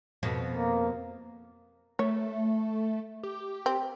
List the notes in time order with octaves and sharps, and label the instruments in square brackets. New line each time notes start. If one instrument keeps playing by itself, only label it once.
[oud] F2 B2
[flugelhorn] A#3
[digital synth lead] A3 [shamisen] C#5
[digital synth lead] G4
[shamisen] C4